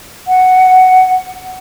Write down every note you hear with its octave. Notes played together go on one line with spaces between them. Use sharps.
F#5